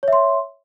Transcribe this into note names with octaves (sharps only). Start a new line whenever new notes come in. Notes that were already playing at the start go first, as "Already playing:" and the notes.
C#5 E5 C6